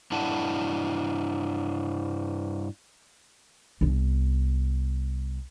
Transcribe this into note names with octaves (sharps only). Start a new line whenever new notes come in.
G2 D4 E4 F#5 A5
C2 B3